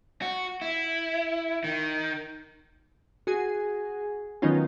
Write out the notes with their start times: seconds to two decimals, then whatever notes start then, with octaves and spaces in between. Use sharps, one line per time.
0.22 F#4
0.62 E4
1.64 D#3
3.27 F#4 G#4
4.42 D#3 F#3 B3 C#4 D#4 F4